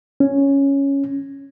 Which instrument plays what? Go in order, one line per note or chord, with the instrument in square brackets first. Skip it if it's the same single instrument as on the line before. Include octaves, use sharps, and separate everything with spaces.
[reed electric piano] C#4